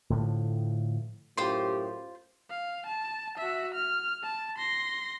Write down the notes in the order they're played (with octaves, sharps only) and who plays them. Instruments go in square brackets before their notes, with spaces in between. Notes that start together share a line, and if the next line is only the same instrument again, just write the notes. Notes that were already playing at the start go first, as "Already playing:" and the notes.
[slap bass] A2 D3 F3
[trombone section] F#2 A2 G4 [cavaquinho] F4 C5 C6
[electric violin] F5
A5
F#4 E5
F6
A5
C6 A#6